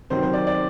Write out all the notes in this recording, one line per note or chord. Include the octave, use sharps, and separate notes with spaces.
C3 D#3 F#3 C5
C5
D5
D5